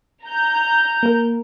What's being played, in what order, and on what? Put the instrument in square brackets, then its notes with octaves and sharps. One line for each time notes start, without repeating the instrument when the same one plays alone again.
[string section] A#5 G6
[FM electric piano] A#3 A#4